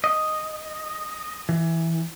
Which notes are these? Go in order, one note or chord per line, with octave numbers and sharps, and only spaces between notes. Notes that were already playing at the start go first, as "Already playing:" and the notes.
D#5
E3